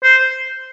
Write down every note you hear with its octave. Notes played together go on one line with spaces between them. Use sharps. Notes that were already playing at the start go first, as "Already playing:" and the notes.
C5